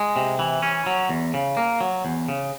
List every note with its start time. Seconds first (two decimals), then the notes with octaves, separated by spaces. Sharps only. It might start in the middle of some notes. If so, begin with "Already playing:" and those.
Already playing: G#3
0.16 C3
0.39 E3
0.62 C#4
0.86 F#3
1.09 E2
1.34 C#3
1.57 A#3
1.81 F#3
2.05 E2
2.29 C#3